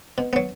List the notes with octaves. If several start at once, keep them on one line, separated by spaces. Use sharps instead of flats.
B2
F#3 B3